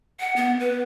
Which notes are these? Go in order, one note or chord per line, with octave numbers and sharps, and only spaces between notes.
F#5
B3
B4